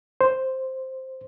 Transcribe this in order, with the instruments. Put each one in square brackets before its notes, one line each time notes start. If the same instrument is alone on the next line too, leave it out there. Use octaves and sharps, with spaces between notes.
[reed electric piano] C5